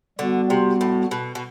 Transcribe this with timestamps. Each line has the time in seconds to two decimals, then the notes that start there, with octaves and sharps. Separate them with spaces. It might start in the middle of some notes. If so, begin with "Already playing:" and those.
0.19 D3 G3 B3 F#4
0.50 C3
0.81 A2
1.11 B2
1.35 B2